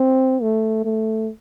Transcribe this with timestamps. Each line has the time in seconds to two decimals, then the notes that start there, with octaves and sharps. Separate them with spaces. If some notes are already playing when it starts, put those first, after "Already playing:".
Already playing: C4
0.42 A3
0.85 A3